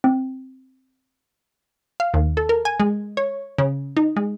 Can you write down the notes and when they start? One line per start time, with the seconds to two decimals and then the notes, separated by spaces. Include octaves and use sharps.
0.04 C4
2.00 F5
2.14 D#2
2.37 A4
2.49 A#4
2.65 G#5
2.80 G#3
3.17 C#5
3.58 C#3
3.97 D#4
4.16 G#3